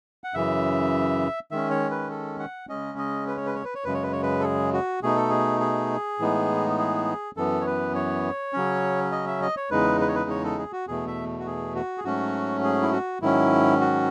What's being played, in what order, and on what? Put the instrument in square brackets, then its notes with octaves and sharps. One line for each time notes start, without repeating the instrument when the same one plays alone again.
[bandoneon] F#5
F#2 C#3 E3 E5
D#3 G#3 C#4 E5
C#5
B4
A4
F#5
C#3 G#3 C#4 D#5
D#5
B4
C#5
B4
C#5
B4
C#5
F#2 C#3 G#3 B4
C#5
B4
C#5
B4
A4
G#4
F#4
B2 A3 D#4 G#4
A4
G#4
G#4
A2 E3 G#3 B3 D#4
G#4
F#2 E3 B3 A4
C#5
B4
C#5
C#3 F#3 C#4
D#5
E5
D#5
C#5
E2 C#3 G#3 D#4 B4
B4
C#5
B4
C#5
A4
G#4
F#4
E2 B2 A3 G#4
E5
F#4
G#4
F#4
G#4
G#2 F#3 A3 C#4 F#4
G#4
E4
F#4
G#2 D#3 F#3 C#4 E4
F#4